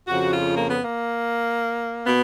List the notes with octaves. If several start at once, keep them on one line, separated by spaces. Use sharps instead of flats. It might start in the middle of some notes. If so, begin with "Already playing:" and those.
F2 C#3 F3 F#4
F4
A#3
B3
A#3
B2 B3